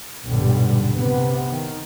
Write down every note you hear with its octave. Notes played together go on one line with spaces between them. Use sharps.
B1 G2 A#2 D3 G3
C3 B3
D#3